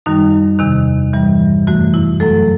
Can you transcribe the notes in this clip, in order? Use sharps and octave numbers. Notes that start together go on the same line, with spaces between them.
F#2 D#3 G3 D#4
E2 C3 D#3
G2 E3 G3
F#2 E3 A3 F#4
E4
F#2 F#3 A3 A4